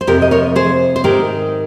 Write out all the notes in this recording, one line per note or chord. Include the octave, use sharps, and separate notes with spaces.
C5
F2 C3 F3 G4 A#4
D#5
A#4 C#5
G#4 C5
C5
G#2 D#3 G4 A#4